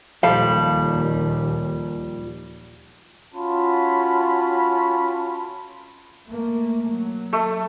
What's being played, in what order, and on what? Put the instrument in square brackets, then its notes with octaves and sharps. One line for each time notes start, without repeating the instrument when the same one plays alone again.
[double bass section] D#2 A#2 [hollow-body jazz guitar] F3 A4 [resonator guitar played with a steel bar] G3 [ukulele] F5
[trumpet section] C#4 F4 F#4 A5 B5
[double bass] A3 A#3
F#3
[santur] A3